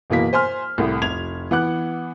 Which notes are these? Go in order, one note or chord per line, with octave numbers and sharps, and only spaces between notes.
F#1 B2 E3 A#3 B6
C5 G#5 C6 F6
C2 A2
F1 G#6 F7
E3 B3 F#5 D6 F#6